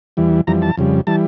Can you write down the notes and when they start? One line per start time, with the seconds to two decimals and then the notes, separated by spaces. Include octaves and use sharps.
0.17 E2 E3 G3
0.47 F2 E3 G3 A#5
0.62 A5
0.77 F2 C#3 G3
1.07 E3 G3 A5